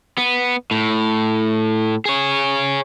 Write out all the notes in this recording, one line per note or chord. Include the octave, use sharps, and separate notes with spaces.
B3
A2
G#4 C#5